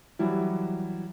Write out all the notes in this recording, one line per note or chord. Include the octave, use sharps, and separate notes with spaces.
E3 F#3 G3 E4